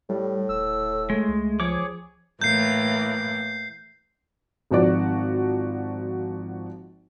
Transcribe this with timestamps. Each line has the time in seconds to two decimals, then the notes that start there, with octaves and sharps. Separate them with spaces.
0.09 A2 G3
0.49 D#1 E6
1.10 G#3 A3
1.29 C#2
1.60 F3 G#4 C#5 D6
2.42 A2 E3 A#3 G6 C7
4.71 G#1 F3 F#4 D5